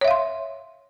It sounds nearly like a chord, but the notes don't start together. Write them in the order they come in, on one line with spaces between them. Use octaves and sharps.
C#5 E5 F5 C6